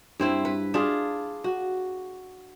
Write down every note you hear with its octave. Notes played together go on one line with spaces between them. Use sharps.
G2 C4 E4
B4
D4 F4 G#4
F#4